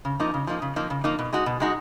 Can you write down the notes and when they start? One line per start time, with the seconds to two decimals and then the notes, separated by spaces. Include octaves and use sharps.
0.05 C#3
0.20 F3 A#3 D#4
0.34 C#3
0.47 F3 A#3 D#4
0.62 C#3
0.76 F3 A#3 D#4
0.90 C#3
1.04 F3 A#3 D#4
1.19 B2
1.33 G#3 D#4 F#4
1.46 B2
1.60 G#3 D#4 F#4